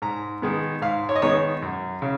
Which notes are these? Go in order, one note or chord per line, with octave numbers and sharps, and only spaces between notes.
G#2 A#5
D#3 G#3 B3
G#2 F5
C#5
D#5
D#3 G#3 B3 C#5
F#2
C#3